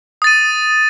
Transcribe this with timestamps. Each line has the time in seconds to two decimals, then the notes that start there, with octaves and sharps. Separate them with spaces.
0.22 D#6
0.24 A6
0.27 D#7